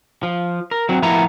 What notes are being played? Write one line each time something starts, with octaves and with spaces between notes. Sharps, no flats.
F3
A#4
F#3 C4
A2 F3 B3 E4 A#4 A#5